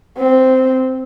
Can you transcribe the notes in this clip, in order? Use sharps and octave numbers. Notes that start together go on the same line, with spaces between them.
C4